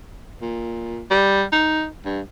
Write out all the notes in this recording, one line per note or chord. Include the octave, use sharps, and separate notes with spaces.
A#2
G3
D#4
G2